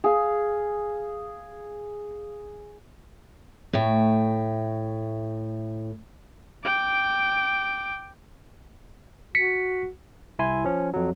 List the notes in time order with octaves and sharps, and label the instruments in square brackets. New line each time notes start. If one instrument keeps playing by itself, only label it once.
[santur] G#4 F5
[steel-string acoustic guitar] A2 A3 G5
[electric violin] G5 D6
[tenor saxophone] F#4 [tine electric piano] B6 C#7
[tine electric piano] C2 E4 G#5 C6
F3 C#4
F2 F#3